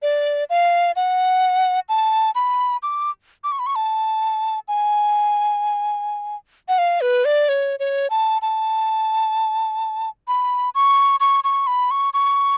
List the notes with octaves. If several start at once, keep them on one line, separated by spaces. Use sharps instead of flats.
D5
F5
F#5
A5
B5
D6
D6
C#6
B5
C#6
A5
G#5
F#5
F5
B4
D5
C#5
C#5
A5
A5
B5
C#6
C#6
C#6
B5
C#6
C#6